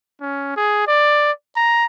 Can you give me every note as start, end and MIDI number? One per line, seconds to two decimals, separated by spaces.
0.21 0.52 61
0.57 0.85 68
0.88 1.31 74
1.56 1.86 82